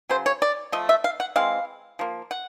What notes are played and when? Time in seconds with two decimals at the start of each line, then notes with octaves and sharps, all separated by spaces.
0.09 C#3 F#3 C5
0.26 C#5
0.42 D5
0.72 F3 A3 D#5
0.89 E5
1.04 F5
1.20 F#5
1.36 E3 G#3 C4 F5
1.99 F3 A#3
2.31 F#5